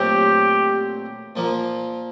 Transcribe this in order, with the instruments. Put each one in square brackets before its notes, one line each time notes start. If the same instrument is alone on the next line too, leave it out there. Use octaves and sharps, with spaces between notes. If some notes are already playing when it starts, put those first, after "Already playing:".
Already playing: [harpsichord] A#2 F#3 A3 C4 [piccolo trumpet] G4
[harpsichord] A#2 F3 A#3